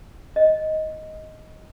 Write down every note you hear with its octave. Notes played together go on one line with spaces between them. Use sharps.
D#5